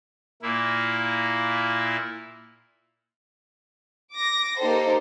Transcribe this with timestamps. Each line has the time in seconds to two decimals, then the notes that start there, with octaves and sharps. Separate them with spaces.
0.42 A#2 A#3 E4
4.13 D6 A#6
4.59 A#3 D#4 G4 A4 C5